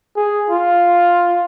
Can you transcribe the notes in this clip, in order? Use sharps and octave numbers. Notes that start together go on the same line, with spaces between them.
G#4
F4